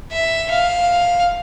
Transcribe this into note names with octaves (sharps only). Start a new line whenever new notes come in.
E5
F5